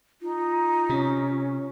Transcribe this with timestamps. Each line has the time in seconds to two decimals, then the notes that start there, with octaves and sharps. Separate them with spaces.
0.21 D#4 F4
0.89 C3 C#4